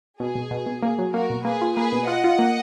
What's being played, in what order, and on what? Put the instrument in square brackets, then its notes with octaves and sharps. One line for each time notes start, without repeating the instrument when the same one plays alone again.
[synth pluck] B2 [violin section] G#4
[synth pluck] B2
B2
B2
[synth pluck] A#3 [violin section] G#4
[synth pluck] F#3
[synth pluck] A#3 [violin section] F#4 A#4
[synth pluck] B2
[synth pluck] A#3 [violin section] G#4 B4
[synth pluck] F4
[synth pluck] A#3 [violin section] G#4 B4
[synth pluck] B2
[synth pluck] F4 [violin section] D#5 F#5
[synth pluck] F4
A#3